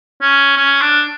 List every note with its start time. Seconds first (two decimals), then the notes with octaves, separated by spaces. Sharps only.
0.21 C#4
0.57 C#4
0.81 D4